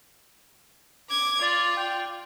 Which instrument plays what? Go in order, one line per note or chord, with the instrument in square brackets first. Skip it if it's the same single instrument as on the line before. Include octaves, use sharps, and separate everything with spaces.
[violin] D6 G#6
[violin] F4 [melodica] D5
[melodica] G5